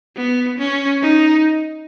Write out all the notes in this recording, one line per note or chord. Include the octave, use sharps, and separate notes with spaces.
B3
C#4
D#4